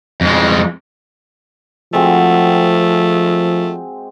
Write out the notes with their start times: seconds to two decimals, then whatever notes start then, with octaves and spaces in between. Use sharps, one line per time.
0.21 F2 G#3
1.93 F3 G#3 A3 C4 F#4